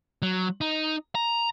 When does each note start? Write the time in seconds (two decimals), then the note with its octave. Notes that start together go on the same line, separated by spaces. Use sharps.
0.22 F#3
0.61 D#4
1.15 A#5